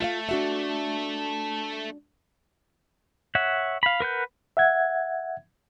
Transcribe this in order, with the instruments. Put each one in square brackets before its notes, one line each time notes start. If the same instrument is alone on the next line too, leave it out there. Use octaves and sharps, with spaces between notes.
[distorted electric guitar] A3 [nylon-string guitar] F4 E5 F5
[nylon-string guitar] D4 F#4 E5
[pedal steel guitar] C#5 E5 F#5
F5 B5
A#4 B4 F#5 G6
[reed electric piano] E5 F#5 G#6